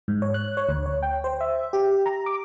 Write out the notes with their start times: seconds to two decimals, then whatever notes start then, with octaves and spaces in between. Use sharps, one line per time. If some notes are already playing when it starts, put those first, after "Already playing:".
0.08 G#2
0.22 C#5
0.34 F#6
0.57 C#5
0.69 D2
0.86 C#5
1.03 G5
1.24 C5
1.41 E5
1.73 G4
2.06 A#5
2.26 D6